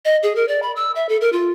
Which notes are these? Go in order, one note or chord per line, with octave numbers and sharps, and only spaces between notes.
D#5
G#4
A#4
D5
B5
E6
E5
A4
A#4
F4